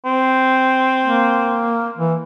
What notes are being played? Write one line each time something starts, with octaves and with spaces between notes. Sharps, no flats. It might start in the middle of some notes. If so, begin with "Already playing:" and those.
C4
A#3
E3